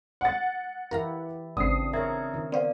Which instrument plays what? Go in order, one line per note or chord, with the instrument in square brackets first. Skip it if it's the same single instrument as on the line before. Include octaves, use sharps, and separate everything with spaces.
[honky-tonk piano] F#5 A6
[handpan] E3 E4 G4 [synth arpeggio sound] A#4 F5 A#5
[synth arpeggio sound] G#1 [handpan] C#3 C4 D4 [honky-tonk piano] D#6 C7
[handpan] A#4 C#5 [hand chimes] E5 A#5 G#6
[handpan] D#3
[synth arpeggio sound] B3 C5 [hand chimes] D5 F5